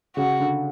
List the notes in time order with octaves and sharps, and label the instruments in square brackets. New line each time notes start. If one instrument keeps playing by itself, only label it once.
[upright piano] C#3 [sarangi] F#4
[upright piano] D3